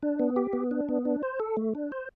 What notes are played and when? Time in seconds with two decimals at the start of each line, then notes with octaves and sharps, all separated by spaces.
0.03 D4
0.19 B3
0.36 G4
0.53 B3
0.71 D4
0.89 B3
1.05 D4
1.23 C5
1.40 A4
1.57 A3
1.75 D4
1.92 C5